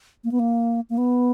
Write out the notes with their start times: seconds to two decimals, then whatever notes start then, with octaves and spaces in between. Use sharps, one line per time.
0.24 A#3
0.31 B3
0.39 A#3
0.90 A#3
0.98 B3